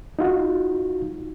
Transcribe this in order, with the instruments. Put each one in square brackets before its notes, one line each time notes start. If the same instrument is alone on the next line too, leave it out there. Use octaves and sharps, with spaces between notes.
[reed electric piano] D#4 F4 F#4